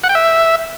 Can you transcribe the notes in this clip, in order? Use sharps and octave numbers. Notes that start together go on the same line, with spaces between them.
F#5
G5
E5